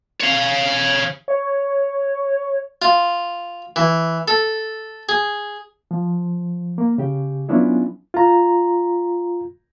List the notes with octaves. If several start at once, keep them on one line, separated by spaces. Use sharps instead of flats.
C#5 F5
C#5
F4
E3
A4
G#4
F3
A#3
C#3 G4
F#3 B3 C#4 D4 E4 F4
F4 A#5